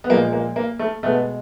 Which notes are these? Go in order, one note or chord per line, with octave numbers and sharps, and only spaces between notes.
B3
A#2 F3 G#3 A#3
A#3
A#3
A3
B2 G#3 A3 B3